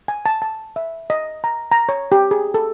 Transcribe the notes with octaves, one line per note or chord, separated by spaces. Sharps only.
G#5
A5
A5
E5
D#5
A#5
A#5
C#5
G4
G#4
A4